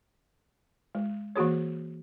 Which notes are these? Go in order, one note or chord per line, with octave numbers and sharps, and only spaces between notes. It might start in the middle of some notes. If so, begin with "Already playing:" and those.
G#3
E3 A#3 F#4 G#4 C#5